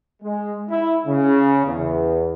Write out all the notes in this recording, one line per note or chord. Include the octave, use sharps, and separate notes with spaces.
G#3
E4
C#3
E2